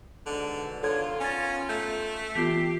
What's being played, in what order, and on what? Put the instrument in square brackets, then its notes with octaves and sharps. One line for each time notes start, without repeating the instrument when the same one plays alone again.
[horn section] G#2 B2 [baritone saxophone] D3
[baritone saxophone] D3 [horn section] D#3 B3 F4 [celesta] A4 C#5 G#6
[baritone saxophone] C#4 [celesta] G#5 A6
[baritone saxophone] A3 [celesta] G6
[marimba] E3 B3 F4 [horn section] G4 [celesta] B6 C7